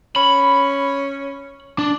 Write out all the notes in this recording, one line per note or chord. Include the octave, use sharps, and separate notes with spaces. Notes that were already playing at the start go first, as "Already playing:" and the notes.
C#4 B5
D4